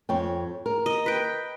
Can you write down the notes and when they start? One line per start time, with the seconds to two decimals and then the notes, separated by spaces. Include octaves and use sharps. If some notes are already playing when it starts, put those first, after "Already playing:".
0.09 F2 C#5 G5
0.66 A#4
0.86 D#5
1.06 B4 G5